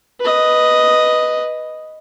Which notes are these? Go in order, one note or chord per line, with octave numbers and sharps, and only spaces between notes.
B4 D#5